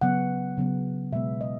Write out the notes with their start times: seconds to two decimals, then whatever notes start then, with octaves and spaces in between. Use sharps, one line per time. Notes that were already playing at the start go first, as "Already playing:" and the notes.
0.01 C#3 F#3 B3 F#5
0.57 C#3 F#3 B3
1.12 B2 G#3 B3 E5
1.41 D#5